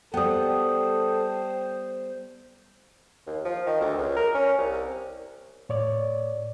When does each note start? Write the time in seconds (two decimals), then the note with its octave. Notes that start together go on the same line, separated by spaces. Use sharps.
0.14 G3 B3 A4 C5 G5 D#6
3.27 D#2
3.45 F3
3.67 D#3
3.81 D2
3.98 C#2
4.17 A#4
4.35 C#4
4.58 C2
5.69 A2 C#5 D5